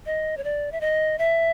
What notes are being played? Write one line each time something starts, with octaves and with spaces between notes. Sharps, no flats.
D#5
C#5
D5
E5
D#5
E5